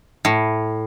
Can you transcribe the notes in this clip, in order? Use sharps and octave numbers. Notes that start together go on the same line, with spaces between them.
A2